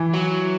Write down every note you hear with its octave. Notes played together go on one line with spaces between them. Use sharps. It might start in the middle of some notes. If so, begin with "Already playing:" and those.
Already playing: E3
F#3